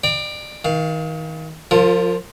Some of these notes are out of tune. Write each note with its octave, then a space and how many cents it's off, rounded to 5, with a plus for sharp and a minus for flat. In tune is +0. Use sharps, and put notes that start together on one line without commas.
D5 +35 G5 +0 A#5 +45
D#3 +35 F5 +0
F3 +25 F4 +0 A#4 -25